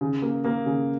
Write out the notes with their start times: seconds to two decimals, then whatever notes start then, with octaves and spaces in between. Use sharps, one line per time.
0.01 C#3
0.22 A#3
0.44 A#3
0.66 C#3